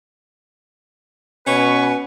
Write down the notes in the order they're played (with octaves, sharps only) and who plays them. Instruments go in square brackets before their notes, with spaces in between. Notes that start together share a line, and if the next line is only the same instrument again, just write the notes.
[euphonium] B2 [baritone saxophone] C#4 [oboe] B4 [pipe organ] C#6